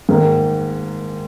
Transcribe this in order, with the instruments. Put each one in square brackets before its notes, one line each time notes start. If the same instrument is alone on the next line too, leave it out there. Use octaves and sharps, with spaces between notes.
[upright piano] G#2 D#3 A#3 D#4 G#4